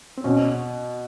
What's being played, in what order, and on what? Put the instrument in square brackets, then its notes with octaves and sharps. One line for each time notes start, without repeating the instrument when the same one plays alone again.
[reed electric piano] C4
[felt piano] B2 [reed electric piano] C#4